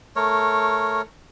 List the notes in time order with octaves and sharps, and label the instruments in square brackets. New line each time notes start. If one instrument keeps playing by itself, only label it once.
[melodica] A3 A#4 C#5